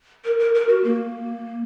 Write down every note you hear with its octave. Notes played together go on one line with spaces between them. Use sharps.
A#4
A#4
A#4
F#4
A#3